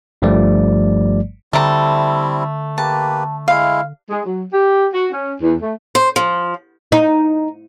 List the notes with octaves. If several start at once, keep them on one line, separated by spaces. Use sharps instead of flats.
G1 G2 F3 G3 A3 D5
D3 G3 A3 C4 E4 D5 A5 A#5
A#3 G4 B4 A5
G#3 E4 F5
G#3
F#3
G4
F#4
C#4
E2
A3
C5
F3
D#4